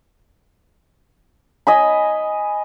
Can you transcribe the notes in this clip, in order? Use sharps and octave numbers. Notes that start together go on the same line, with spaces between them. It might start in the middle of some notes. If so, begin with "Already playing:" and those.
D#5 G#5 B5